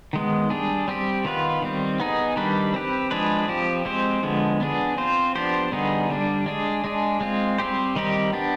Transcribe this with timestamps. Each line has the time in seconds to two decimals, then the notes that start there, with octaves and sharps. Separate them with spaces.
0.13 D#3 G#3 B3
0.50 G3 D4 G#4
0.88 G3 C4 G4
1.25 D#3 B3 F4 B4
1.62 D#3 G3 C4
2.00 B3 D#4 G#4
2.36 D#3 G3 D4 G4 B4
2.74 C4 G4 B4
3.11 F3 G#3 D4 G#4 B4
3.48 F3 C4 G4
3.85 G#3 C4 G4 C5
4.23 D3 F3 G#3 B3
4.61 B3 D4 G#4
4.98 C4 F4 C5
5.35 F3 B3 D4 G4 C5
5.72 D3 G3 B3 D#4 G#4
6.10 D3 G3 D4
6.46 G#3 D4 G#4
6.84 G#3 D4 G#4
7.21 G#3 C4 F4
7.58 G3 C4 G4 C5
7.96 D#3 G3 C4 D#4 G4
8.33 B3 D4 G4